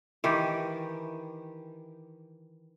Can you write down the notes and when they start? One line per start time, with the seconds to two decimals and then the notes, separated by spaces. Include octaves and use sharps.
0.24 D#3 E3 G4